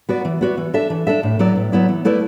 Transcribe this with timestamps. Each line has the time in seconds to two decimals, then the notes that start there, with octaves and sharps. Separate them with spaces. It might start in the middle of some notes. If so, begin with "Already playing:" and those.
0.09 B3 F#4 D5
0.25 E3
0.41 B3 F#4 D5
0.57 E3
0.74 D4 A4 E5
0.90 E3
1.07 D4 A4 E5
1.23 A2
1.39 F#3 B3 E4 D5
1.55 A2
1.72 F#3 B3 E4 D5
1.89 E3
2.05 A3 E4 B4 D5